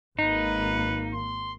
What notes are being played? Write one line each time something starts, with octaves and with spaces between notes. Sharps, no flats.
G#1 A#3 D#4 B4
C6